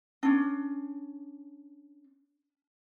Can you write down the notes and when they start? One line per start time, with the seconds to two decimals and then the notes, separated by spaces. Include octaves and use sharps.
0.23 C#4 D4